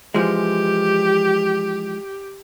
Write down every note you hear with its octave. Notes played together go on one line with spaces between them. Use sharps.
E3 F3 G#3 G4